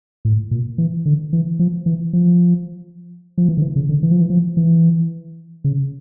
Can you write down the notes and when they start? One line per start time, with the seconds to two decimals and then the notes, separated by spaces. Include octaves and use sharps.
0.25 A2
0.51 A#2
0.78 E3
1.06 D3
1.33 E3
1.59 F3
1.86 E3
2.13 F3
3.38 F3
3.49 E3
3.57 D3
3.62 E3
3.76 C#3
3.89 D3
4.03 E3
4.11 F3
4.21 E3
4.30 F3
4.57 E3
5.64 C#3